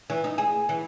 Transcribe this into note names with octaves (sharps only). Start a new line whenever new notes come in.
E3
D#4
G#4
E3